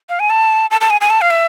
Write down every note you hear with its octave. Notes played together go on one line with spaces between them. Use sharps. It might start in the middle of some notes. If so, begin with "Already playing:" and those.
F5
G#5
A5
A5
A5
G#5
G#5
A5
F5
E5